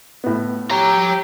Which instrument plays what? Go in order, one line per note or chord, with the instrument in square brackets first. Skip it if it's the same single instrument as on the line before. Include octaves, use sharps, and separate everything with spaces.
[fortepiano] A2 B3
[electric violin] G4 [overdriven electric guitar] C#5 A#5